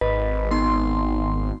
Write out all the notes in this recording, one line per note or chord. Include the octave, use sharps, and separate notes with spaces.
G#1 B4 D#5
B3 D#4 C6